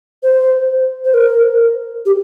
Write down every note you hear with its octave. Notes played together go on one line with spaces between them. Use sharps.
C5
C5
A#4
G4